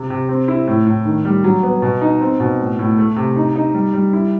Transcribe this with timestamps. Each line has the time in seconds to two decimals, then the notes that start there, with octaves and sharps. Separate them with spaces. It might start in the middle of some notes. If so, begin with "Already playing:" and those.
Already playing: C3
0.10 C3
0.29 C4
0.48 E4
0.67 A2
0.87 A2
1.05 D#3
1.25 G3
1.44 F#3
1.63 B3
1.82 B2
2.01 D#4
2.21 C4
2.40 B2
2.59 A2
2.79 A2
2.98 A3
3.16 C3
3.36 D#4
3.56 D#4
3.74 G3
3.94 G3
4.13 E4